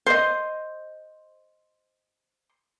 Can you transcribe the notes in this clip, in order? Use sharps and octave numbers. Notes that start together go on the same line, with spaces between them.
C5 D#5